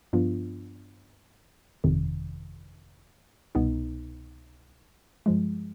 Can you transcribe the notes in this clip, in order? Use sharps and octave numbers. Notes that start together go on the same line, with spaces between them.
G2 F3 B3 D4 F4
G1 F2 C3 D#3
C2 B2 B3 D#4
G2 F3 G#3